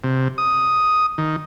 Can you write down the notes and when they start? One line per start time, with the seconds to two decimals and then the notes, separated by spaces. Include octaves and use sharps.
0.04 C3
0.38 D#6
1.18 D#3